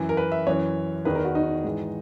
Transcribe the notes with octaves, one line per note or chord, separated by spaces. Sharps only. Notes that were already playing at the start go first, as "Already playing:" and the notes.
Already playing: F#2 E3
A#4
B4
E5
F#2 E3 C#5
E2 D#3 B4
A#4
F#4
D#4
G#2 E3